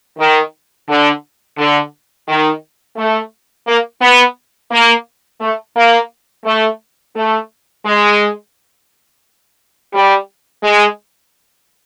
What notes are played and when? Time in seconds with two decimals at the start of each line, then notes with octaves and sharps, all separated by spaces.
0.19 D#3
0.89 D3
1.58 D3
2.28 D#3
2.97 A3
3.67 A#3
4.01 B3
4.71 A#3
5.41 A3
5.76 A#3
6.45 A3
7.15 A3
7.85 G#3
9.93 G3
10.64 G#3